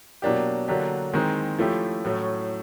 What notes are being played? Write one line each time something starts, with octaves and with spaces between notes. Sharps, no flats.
B2 F#3 A#3 D4 G4
D3 F#3 A#3 D4 G4
D#3 G#3 C4 D#4
F3 A3 C#4 E4 G4
A2 F#3 A3 C#4